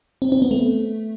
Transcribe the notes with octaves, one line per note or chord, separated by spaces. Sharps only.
C4
C4
B3
A3